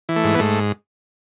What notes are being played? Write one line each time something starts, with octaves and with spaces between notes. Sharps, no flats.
E3
A3
G#2
B3
G#2 A3